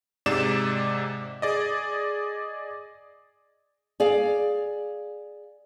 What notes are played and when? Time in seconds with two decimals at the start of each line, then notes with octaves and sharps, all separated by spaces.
0.26 G#2 C3 D5 D6 E7
1.42 G#4 D5 D#5
4.00 G#4 D5 F5